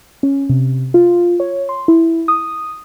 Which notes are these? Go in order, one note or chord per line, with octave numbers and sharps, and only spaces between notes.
C#4
C3
F4
C#5
C6
E4
D#6